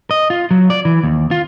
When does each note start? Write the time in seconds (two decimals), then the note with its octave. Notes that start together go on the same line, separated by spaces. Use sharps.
0.11 D#5
0.30 F4
0.51 F#3
0.70 D5
0.85 E3
1.04 D#2
1.31 F4